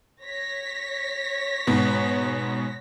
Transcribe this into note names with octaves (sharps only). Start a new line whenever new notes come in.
C#5 A#6 B6
G#2 B2 B3